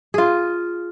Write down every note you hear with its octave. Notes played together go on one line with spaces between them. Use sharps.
F4 G#4